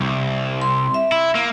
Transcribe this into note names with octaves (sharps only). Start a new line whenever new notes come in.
C2
C6
E5
E4
A#3